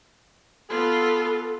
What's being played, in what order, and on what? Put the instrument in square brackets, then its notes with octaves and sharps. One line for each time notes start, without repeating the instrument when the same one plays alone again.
[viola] B3 F4 [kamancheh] A4